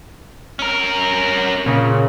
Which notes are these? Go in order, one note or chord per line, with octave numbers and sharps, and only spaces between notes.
C#4 A#4
A#2 C#3